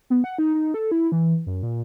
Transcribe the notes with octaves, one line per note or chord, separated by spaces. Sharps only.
B3
F#5
D#4
D#4
A4
E4
E3
F#2
A#2